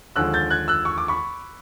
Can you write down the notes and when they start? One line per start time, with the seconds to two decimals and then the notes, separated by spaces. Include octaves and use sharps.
0.16 D#2 D3 F3 G#3 E6 F#6
0.34 G6 A6
0.50 F#6 G#6
0.68 E6 F#6
0.85 C#6
0.98 D6
1.08 B5 C#6